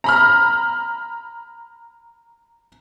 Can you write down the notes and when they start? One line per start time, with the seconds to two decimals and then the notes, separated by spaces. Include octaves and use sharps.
0.04 A#5 B5 F6